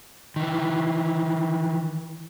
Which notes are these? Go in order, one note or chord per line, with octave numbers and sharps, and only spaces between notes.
D#3 E3